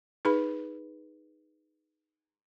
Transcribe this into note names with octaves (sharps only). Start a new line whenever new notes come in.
D#4 G#4 B4 B5